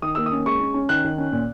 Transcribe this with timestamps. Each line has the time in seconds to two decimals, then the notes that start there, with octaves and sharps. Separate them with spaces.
0.02 D#3 D#6
0.15 A#3 E6
0.26 D#6
0.32 C#4
0.46 G#3 C#6
0.60 C#4
0.74 C#4
0.89 D#3 F#6
1.04 D#3
1.18 C#4
1.32 A#2